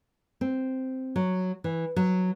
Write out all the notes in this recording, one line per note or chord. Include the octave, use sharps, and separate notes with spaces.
C4
F#3
E3
F#3